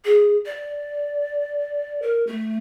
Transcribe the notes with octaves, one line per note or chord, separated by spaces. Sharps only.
G#4
D5
A#4
A3